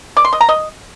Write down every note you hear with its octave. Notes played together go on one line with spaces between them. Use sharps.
D5
C6
D#5
A#5
D#5